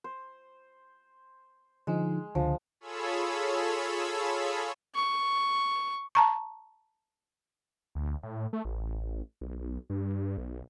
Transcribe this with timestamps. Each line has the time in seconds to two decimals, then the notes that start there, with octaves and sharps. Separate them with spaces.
0.04 C5
1.87 D3 F3 G#3 D#4
2.35 C#2 D3 F3
2.80 F4 G#4 A4 C#5 B5 E6
4.95 C#6
6.15 A5 A#5 C#6
7.95 D2
8.23 A2
8.53 A3
8.65 A1
9.41 B1
9.90 G2
10.38 B1